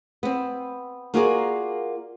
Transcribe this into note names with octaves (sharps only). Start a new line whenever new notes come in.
B3 C4
A#3 F4 F#4 G#4 A#4 D5